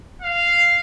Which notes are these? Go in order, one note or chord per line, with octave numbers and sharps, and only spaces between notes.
F5